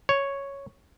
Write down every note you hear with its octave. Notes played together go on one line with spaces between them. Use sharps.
C#5